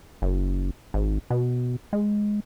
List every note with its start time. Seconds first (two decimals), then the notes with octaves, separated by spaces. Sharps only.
0.22 F#1
0.94 G#1
1.30 B2
1.93 G#3